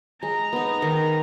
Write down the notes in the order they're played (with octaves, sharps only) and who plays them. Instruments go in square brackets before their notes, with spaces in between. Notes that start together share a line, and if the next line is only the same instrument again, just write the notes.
[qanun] G#3 [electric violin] A#5
[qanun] B3 D#4
D#3